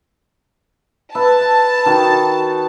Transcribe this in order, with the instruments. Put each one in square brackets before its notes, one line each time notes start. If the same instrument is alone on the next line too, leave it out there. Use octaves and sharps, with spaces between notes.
[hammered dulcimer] B4 E5 [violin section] A5
[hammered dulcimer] D#3 F#4